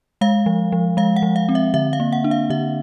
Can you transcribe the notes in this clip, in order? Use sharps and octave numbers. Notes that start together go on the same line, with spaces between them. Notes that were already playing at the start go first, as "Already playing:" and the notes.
G#3 F5
F3
F3
G#3 F5
F#5
F3
F5
C4
E5
D3 E5
F5
A#3
F#5
D4
F5
D3 E5